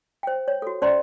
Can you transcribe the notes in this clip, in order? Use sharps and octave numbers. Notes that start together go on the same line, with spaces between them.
C5 G5
C#5
F#4 A4
C#4 C5 D5 A#5 C6